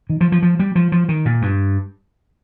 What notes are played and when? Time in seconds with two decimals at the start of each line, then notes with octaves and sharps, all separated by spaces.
0.10 D#3
0.21 F3
0.32 F3
0.42 F3
0.59 G3
0.75 F3
0.92 F3
1.09 D#3
1.25 A#2
1.42 G2